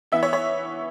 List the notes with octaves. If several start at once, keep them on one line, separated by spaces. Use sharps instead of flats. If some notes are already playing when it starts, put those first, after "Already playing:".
E3 B3 E5
C#5
C#5